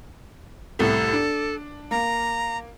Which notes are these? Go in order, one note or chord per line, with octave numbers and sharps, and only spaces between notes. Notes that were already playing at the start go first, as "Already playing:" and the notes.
C2 A2 E4 A4
D4
A#3 A#5